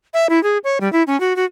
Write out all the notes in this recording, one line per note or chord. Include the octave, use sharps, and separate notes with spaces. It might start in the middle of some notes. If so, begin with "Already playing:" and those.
E5
E4
G#4
C#5
G3
E4
C#4
F#4
F#4